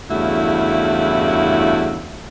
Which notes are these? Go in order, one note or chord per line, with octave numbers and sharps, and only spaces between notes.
E2 G2 C#3 A3 E4 F#4